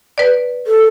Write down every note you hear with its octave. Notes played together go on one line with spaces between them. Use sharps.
B4 D5
A4